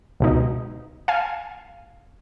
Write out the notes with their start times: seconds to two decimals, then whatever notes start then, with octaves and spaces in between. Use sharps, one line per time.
0.20 C#2 B2 D#4
1.08 F5 G#5